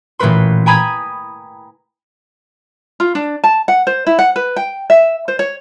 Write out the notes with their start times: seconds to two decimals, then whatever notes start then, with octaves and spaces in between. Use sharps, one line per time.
0.19 A1 A#2 A3 A#4 B4 C6
0.66 G5 G#5 A#5 B5 D#6 G#6
3.00 F4
3.15 D4
3.44 A5
3.68 F#5
3.87 C5
4.07 E4
4.19 F#5
4.36 B4
4.56 G5
4.90 E5
5.28 C5
5.39 C#5